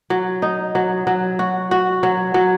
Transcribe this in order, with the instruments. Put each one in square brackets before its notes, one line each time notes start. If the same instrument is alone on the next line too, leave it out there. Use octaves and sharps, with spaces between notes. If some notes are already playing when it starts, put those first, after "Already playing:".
[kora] F#3
D#4
F#3
F#3
F#4
F#4
F#3
F#3